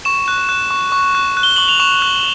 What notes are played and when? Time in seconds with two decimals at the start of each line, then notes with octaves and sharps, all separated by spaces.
0.05 C#6 E7
0.28 F#6
0.49 F#6
0.71 C#6
0.92 C#6
1.15 F#6
1.37 F#6
1.43 G7
1.56 C#6 F#7
1.68 F7
1.80 C#6 E7
2.02 F#6